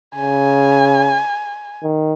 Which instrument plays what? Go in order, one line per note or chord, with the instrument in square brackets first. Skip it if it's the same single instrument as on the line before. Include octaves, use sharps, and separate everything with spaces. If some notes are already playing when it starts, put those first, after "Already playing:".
[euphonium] C#3 [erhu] G#5
[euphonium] D#3